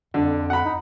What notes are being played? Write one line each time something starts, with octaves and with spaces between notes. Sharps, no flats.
F2 D3
F#5 B5
D#4